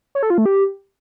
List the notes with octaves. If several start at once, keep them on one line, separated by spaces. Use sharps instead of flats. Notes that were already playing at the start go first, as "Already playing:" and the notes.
C#5
A4
F4
A3
G4